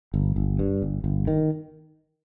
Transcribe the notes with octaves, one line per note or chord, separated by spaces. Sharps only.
G1
G1
G2
G1
G1
D#3